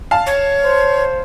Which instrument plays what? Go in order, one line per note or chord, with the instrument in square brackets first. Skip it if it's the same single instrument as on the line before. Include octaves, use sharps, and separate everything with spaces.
[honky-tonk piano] F5 A5
[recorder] C#5
[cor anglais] C5